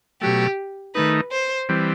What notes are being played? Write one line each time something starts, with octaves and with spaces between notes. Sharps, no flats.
B2 F#3 A3 G4
D#3 A3 D#4 B4
C5
E3 G3 C4